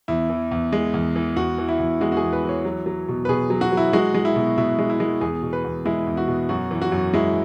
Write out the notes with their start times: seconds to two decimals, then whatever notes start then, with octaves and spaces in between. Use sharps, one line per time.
0.08 E2 E4
0.30 E3
0.52 E2
0.73 G#3
0.94 E2
1.16 E3
1.37 E2 F#4
1.58 E3
1.69 E4
1.80 E2
2.01 G#3 F#4
2.12 F#4
2.17 G#4
2.22 E2
2.33 B4
2.44 E3
2.49 C#5
2.65 F#3
2.86 F#3
3.08 B2
3.25 B4
3.29 B2 G#4
3.50 F#3
3.61 F#4
3.72 F#3 E4
3.93 G#3 F#4
4.14 G#3
4.25 E4
4.36 B2
4.57 B2 E4
4.78 G#3
4.90 E4
5.00 G#3
5.21 E2 G#4
5.42 B2
5.53 B4
5.64 E2
5.86 G#3 E4
6.07 E2
6.17 F#4
6.28 B2
6.49 F#2 F#4
6.71 E3
6.82 F#4
6.92 F#2
7.13 G#3 E4